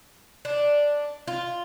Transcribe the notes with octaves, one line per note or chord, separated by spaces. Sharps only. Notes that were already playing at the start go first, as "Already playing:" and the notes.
D4
F4